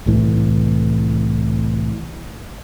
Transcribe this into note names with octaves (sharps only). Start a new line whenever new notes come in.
C2 A2 E3